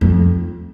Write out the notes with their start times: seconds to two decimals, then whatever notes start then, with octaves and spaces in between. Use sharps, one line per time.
0.01 F2